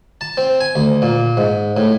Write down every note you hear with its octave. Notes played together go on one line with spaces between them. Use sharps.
A5
C4
G#5
D2
A#2
G#2
A2